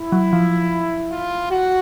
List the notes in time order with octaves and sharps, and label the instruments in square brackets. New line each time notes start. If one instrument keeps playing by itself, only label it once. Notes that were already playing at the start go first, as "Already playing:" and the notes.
Already playing: [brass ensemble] E4
[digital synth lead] F#3
F3
[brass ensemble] F4
F#4